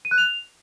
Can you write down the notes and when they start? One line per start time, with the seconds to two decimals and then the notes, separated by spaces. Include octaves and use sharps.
0.05 D#7
0.11 F#6
0.18 F7